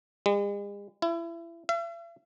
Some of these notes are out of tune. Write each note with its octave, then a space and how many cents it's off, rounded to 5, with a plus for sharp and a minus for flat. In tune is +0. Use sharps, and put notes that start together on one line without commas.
G#3 -45
E4 +30
E5 +45